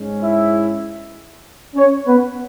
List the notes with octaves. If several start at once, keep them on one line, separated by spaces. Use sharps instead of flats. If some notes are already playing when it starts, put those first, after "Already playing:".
Already playing: G#2 G#3 C#4
E4 E5
C#4 C#5
B3 B4